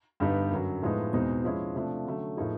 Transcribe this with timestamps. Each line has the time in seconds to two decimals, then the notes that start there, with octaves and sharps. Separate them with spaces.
0.20 G2 D3 G3 B3 D#4
0.51 F#2 D3 F#3
0.82 A2 F3 G#3 B3 D#4
1.13 E2 B2 G#3 C4 D#4
1.44 F3 G#3 C#4 E4
1.75 C3 F3 A3 D4
2.06 D3 F#3 A3 C#4
2.37 A2 F3 A#3 D#4 G#4